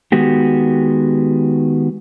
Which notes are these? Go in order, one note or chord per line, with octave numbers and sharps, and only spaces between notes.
D#3 G#3 B3 F#4 G4